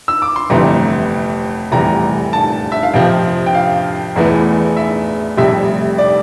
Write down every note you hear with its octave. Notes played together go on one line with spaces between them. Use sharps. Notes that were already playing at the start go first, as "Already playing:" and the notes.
E6
D6
C6
G1 F2 C3 E3 A3 A#5
F1 E2 C3 G3 A#5
A5
E5
F5
F2 C3 F3 G5
G5
F5
E1 E2 E3 A3
E5
F1 F2 C3 G3 E5
D5